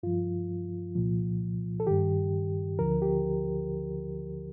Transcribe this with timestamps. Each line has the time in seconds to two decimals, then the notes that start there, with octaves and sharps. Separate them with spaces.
0.03 G2 F3 F4
0.95 C2 A#2 F3
1.80 A4
1.87 G2 D#3 G4
2.79 D2 D3 F3 A#4
3.02 G4